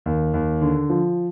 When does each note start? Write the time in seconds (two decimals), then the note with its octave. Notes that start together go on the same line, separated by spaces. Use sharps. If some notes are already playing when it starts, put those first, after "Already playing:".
0.06 D#2
0.34 D#2
0.61 D3
0.90 F3